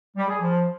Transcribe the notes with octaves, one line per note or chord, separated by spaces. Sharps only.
G3
G#4
F3